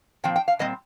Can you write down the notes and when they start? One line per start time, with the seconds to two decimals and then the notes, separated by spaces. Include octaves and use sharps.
0.24 A#2 F3 C4 G5
0.36 G5
0.48 F5
0.59 A#2 G3 C4 D#5